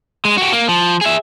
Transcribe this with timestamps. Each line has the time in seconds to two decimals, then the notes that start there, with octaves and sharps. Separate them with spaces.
0.25 G#3
0.38 F#4 G4
0.52 A#3
0.68 F3
1.01 G#4 E5